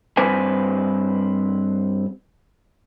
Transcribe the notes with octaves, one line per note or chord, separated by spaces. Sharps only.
G2 C4 B4 G#5